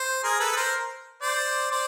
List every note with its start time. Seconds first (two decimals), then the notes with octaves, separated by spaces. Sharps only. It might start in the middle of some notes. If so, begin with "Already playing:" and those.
Already playing: C5
0.24 G#4 A#4
0.40 A4 B4
0.52 B4
0.56 A#4 C5
1.22 C5 D5
1.71 C5 D5